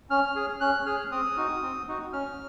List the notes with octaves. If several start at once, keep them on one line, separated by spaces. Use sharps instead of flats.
C#4 F6
G#4
C#4 F#6
G#4 F6
C4 D#6
D#4 F#4
C4
D#4 F#4
C#4 F6